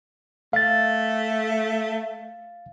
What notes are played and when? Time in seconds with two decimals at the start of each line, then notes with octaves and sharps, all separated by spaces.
0.53 A3 F5 A6